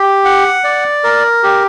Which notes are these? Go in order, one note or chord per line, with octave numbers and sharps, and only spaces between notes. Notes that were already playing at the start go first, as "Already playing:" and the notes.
Already playing: G4
F#5
D5
A#4
G4